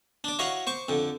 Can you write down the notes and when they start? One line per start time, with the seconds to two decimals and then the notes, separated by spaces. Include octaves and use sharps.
0.24 D4 D5
0.39 E4 F#4 C#5 D#5 F5
0.67 C5 C#6 D6
0.89 F2 D3